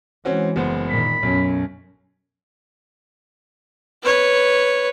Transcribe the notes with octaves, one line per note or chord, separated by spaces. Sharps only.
E3 G#3 C4 C#4 F#4
F#1 B3 C5
A#2 D#3 B5
B1 F#2 C#4
B4 C#5